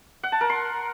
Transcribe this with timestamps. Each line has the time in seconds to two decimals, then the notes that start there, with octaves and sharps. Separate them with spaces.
0.23 F#5
0.32 A5
0.41 A#4
0.49 C6